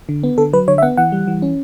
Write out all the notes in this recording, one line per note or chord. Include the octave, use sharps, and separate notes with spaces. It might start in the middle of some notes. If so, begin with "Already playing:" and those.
D3
B3
D3 A4
F#3 B4
D3 C#5
E5
B3 F#5
E3 F#5
G3
E3
C#4